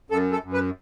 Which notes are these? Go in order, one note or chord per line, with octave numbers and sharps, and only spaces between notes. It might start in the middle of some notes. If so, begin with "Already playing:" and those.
F#2 A4
A4
F#2
B4